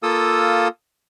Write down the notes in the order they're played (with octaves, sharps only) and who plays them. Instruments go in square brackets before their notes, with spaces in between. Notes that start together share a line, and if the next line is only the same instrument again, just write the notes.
[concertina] A#3 F4 A4 D#6 E6